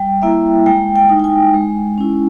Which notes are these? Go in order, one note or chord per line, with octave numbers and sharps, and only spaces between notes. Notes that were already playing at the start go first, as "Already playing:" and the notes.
Already playing: G3 G5
A#3 E4 E5
G#3 G5
G5
D#4
G5
G#5
G#3
C#4 E4